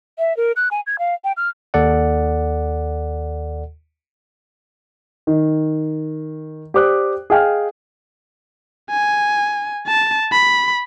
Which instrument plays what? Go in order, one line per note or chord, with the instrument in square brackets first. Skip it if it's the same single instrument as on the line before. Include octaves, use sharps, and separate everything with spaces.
[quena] E5
A#4
F#6
G#5
G#6
F5
G5
F6
[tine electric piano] D#2 A4 D5 F#5
[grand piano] D#3
G4 C5 D5 D6 D#6 F#6
G#4 D#5 F5 G5 G#5 F6
[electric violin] G#5
A5
B5